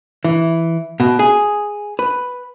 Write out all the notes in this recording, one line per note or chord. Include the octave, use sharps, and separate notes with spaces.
E3
B2
G#4
B4